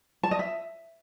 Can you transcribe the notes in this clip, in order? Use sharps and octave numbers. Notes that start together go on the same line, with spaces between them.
A5
D#5
E5